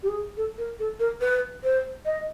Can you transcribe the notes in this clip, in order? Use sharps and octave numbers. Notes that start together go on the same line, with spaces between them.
G4
G#4
A4
A#4
A4
A#4
B4
C5
D#5